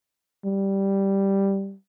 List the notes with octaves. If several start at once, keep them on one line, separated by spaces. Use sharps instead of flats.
G3